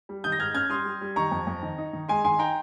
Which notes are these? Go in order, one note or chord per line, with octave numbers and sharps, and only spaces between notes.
G3
D#3 D#6 G6
A#6
G#2 F6 G#6
C#4 F6 G#6
G3 C6 D#6
G3
G3
D#3 A#5 C#6
F2
F2
D#3
D#4
D#3
G#3 G#5 C6
D#3 G#5 C6
D#4 G5 A#5